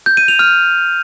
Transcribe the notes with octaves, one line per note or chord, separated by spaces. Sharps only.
G6
D#7
F7
F6